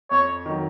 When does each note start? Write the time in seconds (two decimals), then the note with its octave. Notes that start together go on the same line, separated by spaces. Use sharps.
0.10 F2 C#5
0.46 D#3 F#3